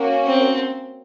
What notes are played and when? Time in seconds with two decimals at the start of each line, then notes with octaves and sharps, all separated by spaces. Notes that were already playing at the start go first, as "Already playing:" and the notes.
Already playing: A#3 C#4 F#4
0.27 C4